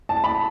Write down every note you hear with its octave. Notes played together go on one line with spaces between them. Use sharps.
A5
B5